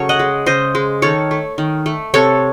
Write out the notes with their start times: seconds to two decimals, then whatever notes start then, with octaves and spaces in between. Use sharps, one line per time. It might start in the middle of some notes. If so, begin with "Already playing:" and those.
Already playing: C#3 F#3 A3 A4 C#5
0.09 D#5 F#5
0.19 G#3
0.46 C#3 C5 D#5
0.75 G#3
1.02 D#3 A4 C#5
1.31 A3
1.58 D#3
1.86 A3
2.14 C3 A4 C#5